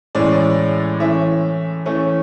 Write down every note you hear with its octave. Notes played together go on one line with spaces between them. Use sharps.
A2 E3 G#3 C#4 D5
E3 A3 C#4 E5
E3 A3 C#4